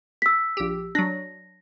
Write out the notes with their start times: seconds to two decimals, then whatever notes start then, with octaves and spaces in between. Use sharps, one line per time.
0.22 E6 B6
0.57 A#1 G4
0.95 F#3 D4 A#6